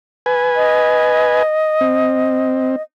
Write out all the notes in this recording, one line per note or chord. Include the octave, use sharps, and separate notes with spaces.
B4 G#5
D#5
C4